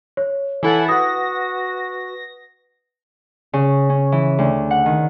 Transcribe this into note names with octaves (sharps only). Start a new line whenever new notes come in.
C#5
E3 E4 A4 F#5 G#5
F#4 B4 F#5 D#6 A#6
C#3
C#4
E3
D2
F#5
D#3